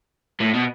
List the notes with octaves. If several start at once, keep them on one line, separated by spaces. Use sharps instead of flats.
A2
B2